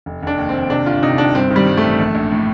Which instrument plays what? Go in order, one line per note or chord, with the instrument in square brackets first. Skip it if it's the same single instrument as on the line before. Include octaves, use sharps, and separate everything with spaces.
[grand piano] F1
F1 D4
D#2
D#2 C4
C3 D4
G1 F4
C3 D#4
G1 D4
G2 C4
D#3
G3
G2
A3
A1
A#1
A#1
A2